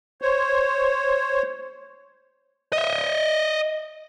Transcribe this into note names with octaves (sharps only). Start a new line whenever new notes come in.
C5 C#5
D#5 E5